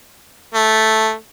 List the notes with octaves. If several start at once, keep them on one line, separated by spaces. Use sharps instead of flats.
A3